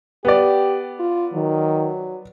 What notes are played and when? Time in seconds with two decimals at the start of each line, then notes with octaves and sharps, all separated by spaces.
0.25 B3 G4 D5
0.99 F4
1.34 D#3 F#3